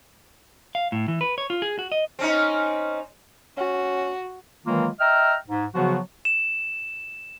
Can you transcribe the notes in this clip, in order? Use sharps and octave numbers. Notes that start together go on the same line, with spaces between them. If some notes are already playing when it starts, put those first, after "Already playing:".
F5
A2
E3
B4
C#5
F4
G#4
F#4
D#5
C4 C#4 D#4
C#4 F#4
D#3 E3 F#3 G#3 A#3 F4
D#5 E5 G5 A#5 F6
G#2
C#3 F3 F#3 B3 F#4
E7